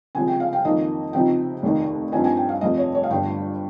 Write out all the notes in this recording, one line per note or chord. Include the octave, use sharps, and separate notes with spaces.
C#2 C3 F3 G#3 G#5
G5
F5
G5
F2 D#3 A#3 D#4 D#5
C#2 C3 F3 C4 D#4 G5
F1 D#2 D#3 A#3 D#4
G2 F3 C4 D#4 G#5
G#5
G5
F5
F1 F2 C3 D#5
C#5
C#5
F5
G1 G2 G3 G5